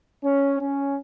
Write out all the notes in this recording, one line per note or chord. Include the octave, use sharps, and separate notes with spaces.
C#4
C#4